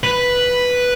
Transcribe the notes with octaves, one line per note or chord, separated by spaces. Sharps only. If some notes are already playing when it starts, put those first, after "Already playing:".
B4